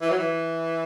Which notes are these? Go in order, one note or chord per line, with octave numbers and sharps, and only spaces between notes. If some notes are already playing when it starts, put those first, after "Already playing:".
E3
F#3
E3